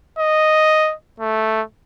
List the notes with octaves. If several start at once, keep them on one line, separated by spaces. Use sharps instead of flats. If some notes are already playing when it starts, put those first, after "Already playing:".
D#5
A3